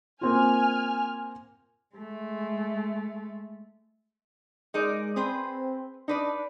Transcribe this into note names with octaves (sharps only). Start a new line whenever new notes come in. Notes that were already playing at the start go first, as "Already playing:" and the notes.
A#3 C4 F4 G#5 F6
G#3 A3
G#3 D#4 A#4 D5
C4 G#4 B4 C5
D4 D#4 B4 D5